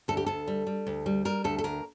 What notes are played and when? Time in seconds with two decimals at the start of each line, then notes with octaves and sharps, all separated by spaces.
0.08 D2 A4
0.17 G4
0.26 D2 A4
0.48 G3
0.67 G3
0.87 D2
1.06 G3
1.25 G3 A#4
1.44 D2 A4
1.58 A4
1.64 D2 A#4